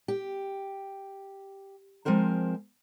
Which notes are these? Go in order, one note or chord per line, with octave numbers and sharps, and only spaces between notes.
G4
F3 G#3 C4 A#4 C5